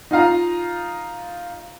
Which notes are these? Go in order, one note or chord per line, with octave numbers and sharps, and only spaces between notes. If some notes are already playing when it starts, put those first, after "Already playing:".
D#4 F4 F5 A#5